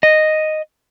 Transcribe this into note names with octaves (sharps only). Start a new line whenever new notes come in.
D#5